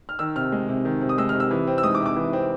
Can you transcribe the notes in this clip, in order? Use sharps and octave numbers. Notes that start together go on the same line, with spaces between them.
F6
D#3 E6
C3 F6
G#3
C3
D#3
C3
D#6
G#3 E6
F6
C3
E6
E3
C4
E6
G#3 D#6
D6
C3
D6
E3
C4